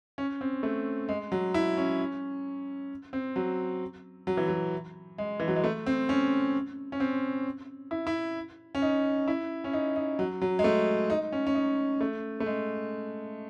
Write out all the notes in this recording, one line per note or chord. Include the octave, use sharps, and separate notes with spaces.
C#4
C4
A3
G#3
F#3
E4
C#4
C4
F#3
F#3
E3
F#3
G#3
E3
F#3
G#3
A3
C4
C#4
C#4
C4
E4
E4
C#4
D#4
E4
C#4
D#4
D#4
F#3
F#3
G#3
A3
D#4
C#4
C#4
D#4
A3
A3
G#3